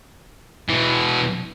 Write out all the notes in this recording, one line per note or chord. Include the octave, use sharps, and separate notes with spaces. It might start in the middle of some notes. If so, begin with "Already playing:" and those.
B2 E3